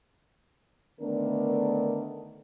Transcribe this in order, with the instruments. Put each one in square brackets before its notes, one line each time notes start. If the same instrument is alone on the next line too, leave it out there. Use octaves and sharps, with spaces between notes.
[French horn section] D3 D#3 A3 B3 D4 A#4